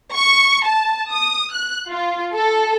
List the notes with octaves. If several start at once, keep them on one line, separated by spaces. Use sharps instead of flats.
C#6
A5
D#6
F#6
F4
A4